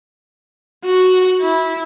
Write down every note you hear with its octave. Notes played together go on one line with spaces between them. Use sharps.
F#4
E4